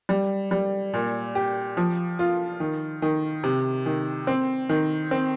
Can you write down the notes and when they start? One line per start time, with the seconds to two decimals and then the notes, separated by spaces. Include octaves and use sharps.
0.09 G3
0.51 G3
0.94 A#2
1.35 G4
1.77 F3
2.19 F4
2.60 D#3
3.02 D#3
3.44 C3
3.86 D#3
4.27 C4
4.69 D#3
5.11 C4